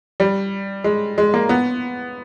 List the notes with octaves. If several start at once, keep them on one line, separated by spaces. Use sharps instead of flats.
G3
G#3
G#3
A#3
B3